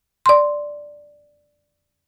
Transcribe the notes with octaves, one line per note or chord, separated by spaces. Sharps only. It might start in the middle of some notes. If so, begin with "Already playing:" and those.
D5 C6